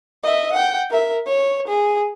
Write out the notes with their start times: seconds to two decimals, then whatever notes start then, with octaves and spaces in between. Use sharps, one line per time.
0.23 D#5 E5
0.53 F#5 G5
0.90 A#4 E5
1.26 C#5
1.68 G#4